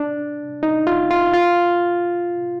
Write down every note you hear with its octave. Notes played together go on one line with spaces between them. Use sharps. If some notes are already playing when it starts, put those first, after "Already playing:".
Already playing: D4
D#4
F4
F4
F4